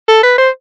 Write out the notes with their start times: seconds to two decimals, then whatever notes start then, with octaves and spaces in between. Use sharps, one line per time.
0.08 A4
0.23 B4
0.38 C5